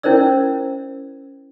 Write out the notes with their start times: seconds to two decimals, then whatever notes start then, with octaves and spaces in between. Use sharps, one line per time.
0.03 C#4 E4 A#4 C5 D5 E6